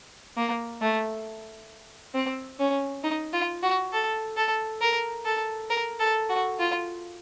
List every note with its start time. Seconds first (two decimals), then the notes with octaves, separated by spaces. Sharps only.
0.37 A#3
0.81 A3
2.15 C4
2.59 C#4
3.04 D#4
3.33 F4
3.63 F#4
3.93 A4
4.37 A4
4.81 A#4
5.25 A4
5.70 A#4
6.00 A4
6.29 F#4
6.59 F4